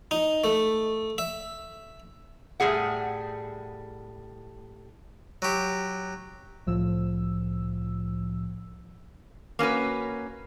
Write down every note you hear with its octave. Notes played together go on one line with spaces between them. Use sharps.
D#4
A3
E5
A2 G3 G#4 F#5
F#3 G4
C2 A2 F3 E6
A#3 C#4 F#4 B4